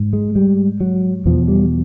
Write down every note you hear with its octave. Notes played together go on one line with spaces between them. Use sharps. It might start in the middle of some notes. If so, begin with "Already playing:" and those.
Already playing: G#2
G#3
G3
F#3
E2 B2 F3
G3